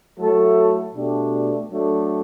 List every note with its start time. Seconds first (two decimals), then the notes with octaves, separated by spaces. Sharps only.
0.18 F#3 A3 E4 A4
0.93 B2 A3 D4 G4
1.69 F#3 A3 D4 A4